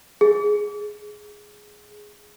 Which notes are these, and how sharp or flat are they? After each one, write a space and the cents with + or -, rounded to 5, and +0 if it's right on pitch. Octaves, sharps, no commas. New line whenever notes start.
G#4 +5